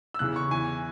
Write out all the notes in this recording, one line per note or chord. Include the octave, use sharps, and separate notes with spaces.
E6
E2 C#3 E3 F#6
C#6
E2 E3 G#5